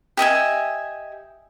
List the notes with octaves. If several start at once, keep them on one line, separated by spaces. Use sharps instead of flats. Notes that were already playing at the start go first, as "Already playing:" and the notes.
G4 D#5 E5 G#5